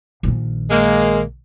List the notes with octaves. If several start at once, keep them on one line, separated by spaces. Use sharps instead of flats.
A#1 D#3
G#3 A#3